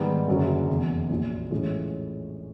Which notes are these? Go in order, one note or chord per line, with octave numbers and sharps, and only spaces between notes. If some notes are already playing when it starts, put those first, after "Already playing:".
Already playing: G#2 D#3 G3 B3
F#1 F#2 D3 F#3
F1 E2 C3
A#1 A#2 F#3
A2 E3 G#3 C#4 F4